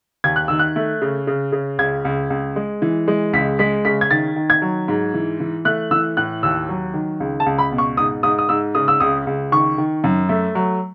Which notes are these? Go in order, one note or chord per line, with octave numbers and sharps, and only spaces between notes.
D#2 G#6
F#6
D#3 E6
F#6
A3
C#3
C#3
C#3
C#2 G#6
C#2
C#2
G#3
E3
G#3
C#2 B6
G#3 B6
C#3 B6
G#6
D#3 A6
D#3
G#6
F#3
G#2
E3
E3
A3 F#6
E3 E6
A2 F#6
D#2 E6
F#3
D#3
C#2
A5
C#2
B5
B2
C#6
G#2 D#6
G#2 D#6
D#6
G#2 E6
C#3 D#6
E6
C#2 D#6
C#2
D#3 C#6
D#3
F#2
A3
F#3